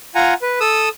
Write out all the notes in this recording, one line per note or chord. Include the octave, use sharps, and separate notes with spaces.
F4 F#5 G#5 A#5
B4
A4 D#6 E6